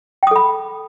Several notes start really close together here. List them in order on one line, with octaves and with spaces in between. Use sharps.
G5 D#6 A4 B5